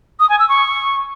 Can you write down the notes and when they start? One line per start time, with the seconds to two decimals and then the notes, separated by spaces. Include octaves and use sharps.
0.20 D#6
0.29 G#5
0.39 E6
0.49 C#6